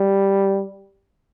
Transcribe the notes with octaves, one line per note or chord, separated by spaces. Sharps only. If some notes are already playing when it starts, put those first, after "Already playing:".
Already playing: G3